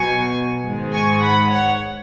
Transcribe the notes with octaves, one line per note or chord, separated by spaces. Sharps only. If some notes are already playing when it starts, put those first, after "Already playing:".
Already playing: B2 F#3 G#5 C#6
G#2 D#3 G#3
G#5 C#6
F#5 B5
C#5 F#5